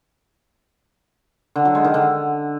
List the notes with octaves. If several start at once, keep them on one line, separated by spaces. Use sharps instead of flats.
D3
F#3
G#3
D#3
D3